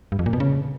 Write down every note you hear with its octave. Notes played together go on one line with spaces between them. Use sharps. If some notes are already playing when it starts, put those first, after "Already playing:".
G2
F2
A#2
B2
C#3